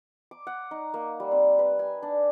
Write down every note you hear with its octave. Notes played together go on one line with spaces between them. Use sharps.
D6
F#5
D#4
A#3
G3
C4
B4
G#5
D4